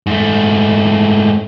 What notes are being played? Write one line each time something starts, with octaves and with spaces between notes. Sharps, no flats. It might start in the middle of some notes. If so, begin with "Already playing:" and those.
G#2 A3